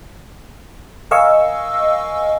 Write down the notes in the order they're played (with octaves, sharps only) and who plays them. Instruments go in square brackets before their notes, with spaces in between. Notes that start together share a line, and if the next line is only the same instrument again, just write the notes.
[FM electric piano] A#4 D#5 F5 G#5 C#6 E6